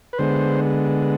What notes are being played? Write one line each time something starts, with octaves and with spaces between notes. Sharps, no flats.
B4
D3 G#3 B3 C5